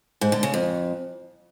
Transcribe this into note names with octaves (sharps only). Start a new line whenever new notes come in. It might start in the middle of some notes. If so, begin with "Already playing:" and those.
G#2
D3
C#3
F2